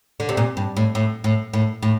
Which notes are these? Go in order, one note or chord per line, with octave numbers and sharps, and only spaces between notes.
D3
C3
A#2
G2
A2
A2
A2
A2
A2